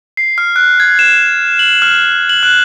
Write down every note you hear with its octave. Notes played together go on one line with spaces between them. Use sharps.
C7
F6
F#6
G#6
E7
F#7
F6
F#7
F#6